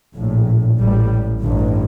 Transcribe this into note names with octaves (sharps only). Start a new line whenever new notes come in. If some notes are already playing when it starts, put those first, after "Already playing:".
A#1 A2
A1 A2 G3
A1 G2